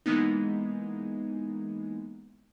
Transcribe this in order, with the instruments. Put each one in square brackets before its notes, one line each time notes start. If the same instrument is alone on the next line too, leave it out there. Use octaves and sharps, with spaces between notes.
[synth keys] E3 G#3 A#3 B3 D#4